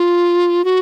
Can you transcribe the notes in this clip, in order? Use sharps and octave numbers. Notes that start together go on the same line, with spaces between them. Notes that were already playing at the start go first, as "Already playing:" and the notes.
Already playing: F4
F#4